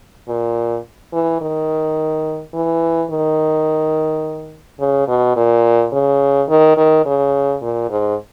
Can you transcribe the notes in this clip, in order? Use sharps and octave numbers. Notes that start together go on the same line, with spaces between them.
A#2
E3
D#3
E3
D#3
C#3
B2
A#2
C#3
D#3
D#3
C#3
A#2
G#2